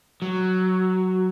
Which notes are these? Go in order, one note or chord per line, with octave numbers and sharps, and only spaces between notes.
F#3